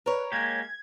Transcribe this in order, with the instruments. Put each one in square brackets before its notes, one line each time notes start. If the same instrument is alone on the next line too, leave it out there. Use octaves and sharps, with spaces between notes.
[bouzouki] A#4 C#5 [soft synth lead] B4
[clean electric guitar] G#3 A#3 G4 [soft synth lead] G#6